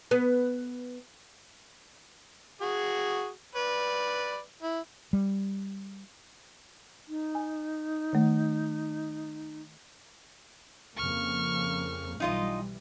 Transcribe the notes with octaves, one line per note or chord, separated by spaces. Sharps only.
B3
F#4 G#4
B4 D5
E4
G3
D#4
G#5
D#3 A3
F2 C#3 A#3 C#6 F6
B1 E3 G3 D#4 F4 D#5